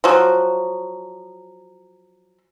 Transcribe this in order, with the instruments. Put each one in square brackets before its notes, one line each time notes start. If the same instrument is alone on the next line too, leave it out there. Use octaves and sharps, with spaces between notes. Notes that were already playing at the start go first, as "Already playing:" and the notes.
[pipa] F3 F#3